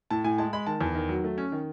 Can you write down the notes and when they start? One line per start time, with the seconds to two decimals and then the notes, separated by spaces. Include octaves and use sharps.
0.10 A2 A5
0.24 A2 G#5
0.38 G#3 A5
0.53 G#3 B5
0.67 D#3 A5
0.81 E2
0.95 D#3
1.09 F#3
1.24 A3
1.38 C#4
1.52 D#3